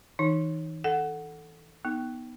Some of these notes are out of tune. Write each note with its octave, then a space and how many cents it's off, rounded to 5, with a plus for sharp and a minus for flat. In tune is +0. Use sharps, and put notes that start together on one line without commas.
E3 -35 D#4 -10
A4 +0 F#5 +0
B3 -10 D#4 +0